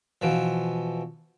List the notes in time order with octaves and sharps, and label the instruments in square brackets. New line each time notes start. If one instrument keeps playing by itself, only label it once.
[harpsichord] B2 E3 F3